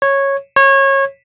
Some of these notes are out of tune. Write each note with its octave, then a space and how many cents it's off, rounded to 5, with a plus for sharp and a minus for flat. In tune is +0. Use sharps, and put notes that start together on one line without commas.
C#5 -10
C#5 -25